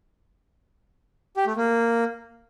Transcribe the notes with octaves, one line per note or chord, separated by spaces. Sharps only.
G4
A3
A#3